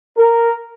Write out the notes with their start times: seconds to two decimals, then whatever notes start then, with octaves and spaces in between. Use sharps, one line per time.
0.17 A#4